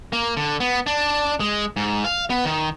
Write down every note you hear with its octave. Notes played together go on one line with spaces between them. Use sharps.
A#3
D3
B3
D4
G#3
G#2
F5
B3
D#3